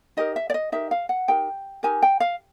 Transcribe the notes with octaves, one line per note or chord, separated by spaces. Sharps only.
D#4 G4 A#4 D#5
E5
D5
D#5
D#4 G4 A#4 E5
F5
F#5
D#4 G4 A#4 G5
D#4 G4 A#4 G#5
G5
F5